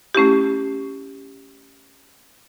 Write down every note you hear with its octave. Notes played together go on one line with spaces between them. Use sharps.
A3 C#4 E4 G4